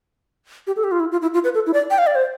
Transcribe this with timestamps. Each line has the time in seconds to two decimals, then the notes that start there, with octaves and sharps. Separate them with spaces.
0.67 G4
0.76 A4
0.84 G4
0.92 F4
1.00 E4
1.12 F4
1.22 E4
1.34 F4
1.44 B4
1.55 A4
1.66 E4
1.74 D5
1.91 G5
1.98 F5
2.07 D5
2.15 C5